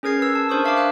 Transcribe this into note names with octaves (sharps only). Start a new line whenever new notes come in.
C#4 G#4 A#4 G#6 C7
B4 E6
A5
D4 A#4 C5 C#6 D#6
E5 F5 A5 D6
F5 F#6